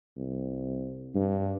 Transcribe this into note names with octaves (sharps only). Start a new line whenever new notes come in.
C2
G2